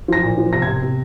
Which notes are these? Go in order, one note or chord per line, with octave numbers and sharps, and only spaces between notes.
F3 A#6
A#2
F3
C3 A#6
G#6
C3
C3